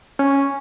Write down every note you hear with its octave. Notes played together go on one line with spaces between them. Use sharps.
C#4